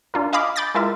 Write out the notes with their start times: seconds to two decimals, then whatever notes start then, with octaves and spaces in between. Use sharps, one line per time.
0.14 D4 F4 A#4
0.33 D#5 F5 G#5 B5 D6
0.56 B5 D6 G6 A6 A#6
0.75 G#3 E4 F4 A#4 E5